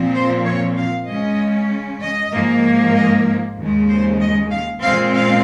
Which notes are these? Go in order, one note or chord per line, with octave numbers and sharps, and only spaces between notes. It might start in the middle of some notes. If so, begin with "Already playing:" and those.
Already playing: A#2 F3 C4
C5
C#5
F5
C#3 G#3 C#4 D#5
D#5
G#2 F3 A#3
D#5
D#2 C#3 G#3
C5
D#5
F5
A#2 G#3 C4 F5
F5